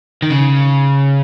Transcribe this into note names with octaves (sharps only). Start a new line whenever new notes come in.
D#3
C#3